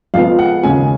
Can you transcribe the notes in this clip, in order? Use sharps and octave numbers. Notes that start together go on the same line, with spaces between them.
F2 F3 G#3 B3 F5
F#5
D#2 C#3 G#3 C#4 G#5